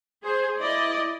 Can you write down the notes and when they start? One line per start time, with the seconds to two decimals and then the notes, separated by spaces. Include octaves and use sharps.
0.24 G#4 C5
0.60 E4 D5 D#5